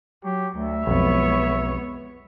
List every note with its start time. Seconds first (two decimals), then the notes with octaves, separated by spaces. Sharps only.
0.24 F#3 G4
0.58 D2 E5
0.87 B1 F2 G#3 B3 C#5